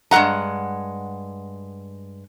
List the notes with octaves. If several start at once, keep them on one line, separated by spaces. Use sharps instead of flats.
G2 G#3 A4 F#5 A#5